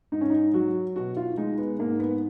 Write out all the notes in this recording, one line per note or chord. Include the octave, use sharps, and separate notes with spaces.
G#2 D#4
C#4
D#4
F#3 F#4
B2 F#4
F4
G#3 D#4
B3
G#2 A#3
B3